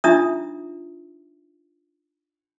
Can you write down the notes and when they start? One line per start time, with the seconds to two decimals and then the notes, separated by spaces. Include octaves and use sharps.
0.04 D4 D#4 F4 E5 A#5 D#6